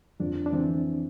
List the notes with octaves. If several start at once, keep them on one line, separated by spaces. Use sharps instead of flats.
F2 D4
D4
E3 C4